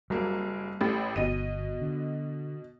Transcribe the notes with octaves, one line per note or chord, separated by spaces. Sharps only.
F#1 F#3 G3 A#3
A1 A2 G4
G1 B2 D#5 D#7
D3